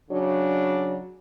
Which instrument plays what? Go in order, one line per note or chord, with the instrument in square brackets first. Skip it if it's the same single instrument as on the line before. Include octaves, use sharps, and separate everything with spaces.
[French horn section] C#3 F#3 D4